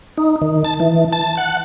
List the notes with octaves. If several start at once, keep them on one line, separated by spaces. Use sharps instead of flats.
D#4
D#3
A5
E3
A5
F#5